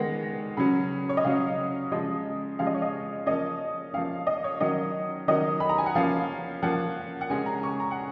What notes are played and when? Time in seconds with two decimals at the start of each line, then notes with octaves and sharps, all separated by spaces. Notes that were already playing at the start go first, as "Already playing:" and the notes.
Already playing: D#3 G#3 B3 A#6
0.57 C#3 F#3 C#4 B5
1.09 C#5
1.17 D#5
1.24 C#3 F#3 C#4 F5
1.92 C#3 F3 G#3 D#5
2.59 C#3 F3 G#3 F5
2.67 D#5
2.74 C#5
2.82 D#5
3.26 F3 A#3 C#4 D#5
3.94 F3 A#3 C#4 F5
4.27 D#5
4.44 C#5
4.60 D#3 F#3 C#4 D#5
5.28 D#3 F#3 C#4 D#5
5.60 B5
5.69 A#5
5.78 G#5
5.86 F#5
5.95 F3 A#3 C#4 F5
6.63 F3 A#3 C#4 F#5
7.21 F#5
7.30 C#3 G#3 C#4 G#5
7.46 A#5
7.63 C#6
7.80 A#5
7.91 F#5